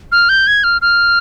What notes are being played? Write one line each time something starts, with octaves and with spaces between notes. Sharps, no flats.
F6
G6
G#6
F6
F6